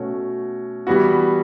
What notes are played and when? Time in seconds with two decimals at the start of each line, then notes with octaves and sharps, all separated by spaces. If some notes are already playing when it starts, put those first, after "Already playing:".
Already playing: B2 A3 C#4 F#4
0.87 E3 G3 B3 F#4